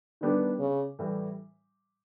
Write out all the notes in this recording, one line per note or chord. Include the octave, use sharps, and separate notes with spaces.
D3 D#3 G3 B3 D4 G4
C#3
A2 E3 G3